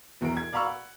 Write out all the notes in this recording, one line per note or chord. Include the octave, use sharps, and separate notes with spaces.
B1 E2 E4 A#4 D7
G#6
D5 F5 A#5 B5 C#6 E6
F#5